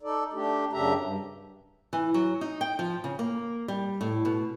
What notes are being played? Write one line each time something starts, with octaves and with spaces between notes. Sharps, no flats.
D#4 A4 D5
A3 D4 G4
F#2 C#3 D4 G4 E5 A#5
G2
E3
F#3
D#4
G5
F3
C#3
A#3
G3
A2
B2